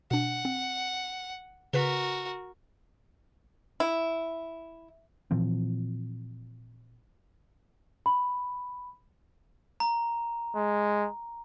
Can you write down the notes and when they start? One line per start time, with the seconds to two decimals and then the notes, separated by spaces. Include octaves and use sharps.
0.11 B2 D4 F#5
0.45 C4
1.74 C#3 F#4 A#4 B4 B6
3.80 E4
5.31 A#2 E3 F3 C4
8.06 B5
9.80 A#5
10.56 G#3